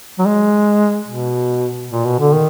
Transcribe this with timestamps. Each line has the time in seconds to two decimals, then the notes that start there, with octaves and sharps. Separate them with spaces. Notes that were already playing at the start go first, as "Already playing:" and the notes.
0.19 F#3
0.26 G#3
1.08 B2
1.91 A#2
2.05 B2
2.19 D3
2.33 D#3